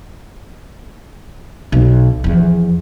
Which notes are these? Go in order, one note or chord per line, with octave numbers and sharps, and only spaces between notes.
B1
E2 F3